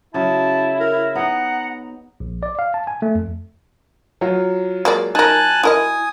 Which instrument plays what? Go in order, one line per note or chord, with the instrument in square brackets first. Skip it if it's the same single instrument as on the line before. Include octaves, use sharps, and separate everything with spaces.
[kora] C#3 F#3 [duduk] E4 [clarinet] A5
[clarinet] A#4
[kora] B3 D#4 [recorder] F#5 [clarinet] A#5
[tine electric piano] A#1
D5
F5
A5
G#5
A3
F2
[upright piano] F#3 F4
[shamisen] G#3 A#3 D5
[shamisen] D#4 A#4 [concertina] G#5 A5 F#6
[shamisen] E4 A#4 D#5 [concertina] G#5 D#6